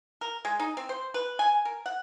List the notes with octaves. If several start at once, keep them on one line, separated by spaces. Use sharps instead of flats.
A#4
G#3
D#4
C4
C5
B4
G#5
A#4
F#5